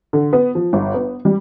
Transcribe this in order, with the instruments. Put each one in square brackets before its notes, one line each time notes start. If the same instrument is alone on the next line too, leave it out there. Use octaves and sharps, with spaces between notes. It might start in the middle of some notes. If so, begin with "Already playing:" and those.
[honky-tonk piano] D3
B3
F3
G1
B3
G3